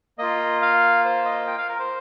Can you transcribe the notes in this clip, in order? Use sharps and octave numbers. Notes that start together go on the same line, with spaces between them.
A#3 F4 D#5
F5
C5
D#5
G5
F5
A#4
C5